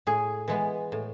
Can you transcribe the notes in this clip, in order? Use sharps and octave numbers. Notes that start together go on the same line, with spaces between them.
A2 G#4
E3 G#3 B3
A2